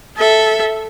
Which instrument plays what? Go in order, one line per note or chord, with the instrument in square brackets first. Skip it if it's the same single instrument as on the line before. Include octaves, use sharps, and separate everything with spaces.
[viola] A4 E5